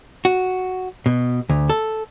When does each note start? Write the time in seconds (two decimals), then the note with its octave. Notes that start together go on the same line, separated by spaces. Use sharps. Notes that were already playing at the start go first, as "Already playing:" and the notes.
0.25 F#4
1.06 B2
1.50 D2
1.70 A4